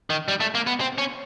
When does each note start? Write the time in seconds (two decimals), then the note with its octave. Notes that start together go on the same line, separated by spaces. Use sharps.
0.10 D#3
0.28 G3
0.40 A3
0.55 A#3
0.67 B3
0.80 C4
0.98 C#4